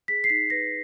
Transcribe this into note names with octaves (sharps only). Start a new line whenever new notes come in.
G#4 B6
C7
D#4 B6
B4 A#6